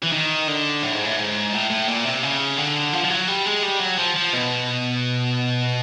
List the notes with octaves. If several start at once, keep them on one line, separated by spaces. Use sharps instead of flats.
E3
D#3
D3
A2
G#2
A2
G#2
A2
A2
A#2
C3
C#3
D3
F3
F3
F#3
G3
G#3
G3
F#3
F3
F3
B2